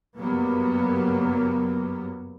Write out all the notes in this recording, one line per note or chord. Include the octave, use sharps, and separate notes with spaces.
F#1 G2 F#3 G3 A#3 B3